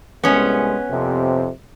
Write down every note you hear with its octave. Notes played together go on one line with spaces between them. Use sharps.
C2 G#3 B3 C#4
F2 C3